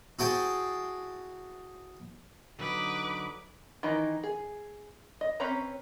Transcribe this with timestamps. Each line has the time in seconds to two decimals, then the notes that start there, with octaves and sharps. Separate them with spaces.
0.19 E4 F#4 G#4 C5 G5 A5
2.59 D3 F#3 D#4 B4 D6
3.83 D#3 E3 D#4
4.23 G#4
5.21 D#5
5.40 C4 C#4 B4 C#5 A#5